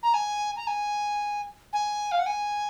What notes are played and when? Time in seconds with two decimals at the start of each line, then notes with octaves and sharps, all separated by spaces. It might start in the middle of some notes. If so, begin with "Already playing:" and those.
0.03 A#5
0.14 G#5
0.56 A#5
0.67 G#5
1.73 G#5
2.12 F5
2.19 F#5
2.26 G#5